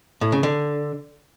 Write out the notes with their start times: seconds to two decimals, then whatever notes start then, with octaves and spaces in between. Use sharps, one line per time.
0.21 A2
0.32 C#3
0.43 D3